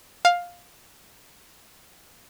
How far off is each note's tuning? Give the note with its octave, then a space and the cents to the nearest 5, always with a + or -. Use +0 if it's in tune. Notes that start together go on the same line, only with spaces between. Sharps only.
F5 +10